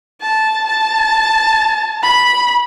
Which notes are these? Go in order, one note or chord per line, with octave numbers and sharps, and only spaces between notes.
A5
A5
B5